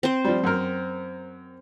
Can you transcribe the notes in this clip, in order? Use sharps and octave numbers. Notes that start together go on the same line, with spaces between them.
C4 C5
F3 G3
F#2 A#4